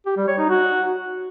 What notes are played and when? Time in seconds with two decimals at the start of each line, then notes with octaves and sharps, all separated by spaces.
0.06 G4
0.17 G3
0.28 C#5
0.38 D#4
0.49 F#4